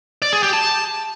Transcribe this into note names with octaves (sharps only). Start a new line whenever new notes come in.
D5
G#4
G4
A5